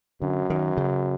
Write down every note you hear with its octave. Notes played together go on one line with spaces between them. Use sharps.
F#2 D3
D#3
C#3